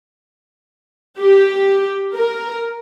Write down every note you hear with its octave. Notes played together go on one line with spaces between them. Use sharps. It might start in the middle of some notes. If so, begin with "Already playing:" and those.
G4
A#4